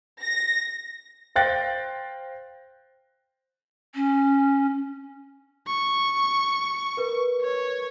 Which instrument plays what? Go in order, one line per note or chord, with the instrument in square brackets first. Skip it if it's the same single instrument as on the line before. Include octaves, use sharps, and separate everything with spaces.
[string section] A#6
[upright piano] C5 F5 G5 F#6 A6 A#6
[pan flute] C#4
[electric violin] C#6
[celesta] A#4 B4
[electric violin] C#5